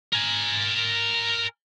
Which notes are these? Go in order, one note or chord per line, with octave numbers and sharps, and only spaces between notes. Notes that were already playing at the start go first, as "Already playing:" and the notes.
A#4 G#5